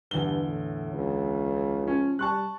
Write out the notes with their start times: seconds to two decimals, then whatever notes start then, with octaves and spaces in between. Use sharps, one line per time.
0.11 E2 G2 D3 G7
0.47 A2
0.93 C#2
1.83 F3 C#4
2.19 G3 A5 C#6 F#6